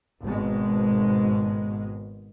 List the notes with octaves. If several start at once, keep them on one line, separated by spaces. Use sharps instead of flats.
G#1 G#2 B2 G#3